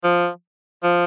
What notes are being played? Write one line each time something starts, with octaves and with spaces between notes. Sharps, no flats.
F3
F3